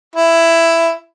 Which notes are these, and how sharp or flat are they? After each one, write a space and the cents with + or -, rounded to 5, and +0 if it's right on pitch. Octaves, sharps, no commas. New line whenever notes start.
E4 +10